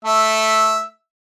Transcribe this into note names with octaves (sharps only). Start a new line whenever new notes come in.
A3 E5